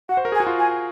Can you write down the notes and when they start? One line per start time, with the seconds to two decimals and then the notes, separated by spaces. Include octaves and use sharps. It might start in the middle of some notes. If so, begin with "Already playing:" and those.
0.09 F#4 F#5
0.17 C5
0.25 A#4
0.32 G#4
0.35 G#5
0.40 F#4
0.47 F4
0.59 G#5